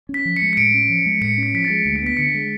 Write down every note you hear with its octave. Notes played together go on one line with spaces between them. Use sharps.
C#4
B6
F3
C#7
G#3
C#7
A2 D7
C#4
F3
G#3
A2 C#7
C#4
B6
F3 B6
A6
G#3
D2 D7
C#7
B3 B6
D3 C#7
G#3